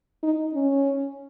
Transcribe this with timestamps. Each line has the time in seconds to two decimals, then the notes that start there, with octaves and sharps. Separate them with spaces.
0.23 D#4
0.54 C#4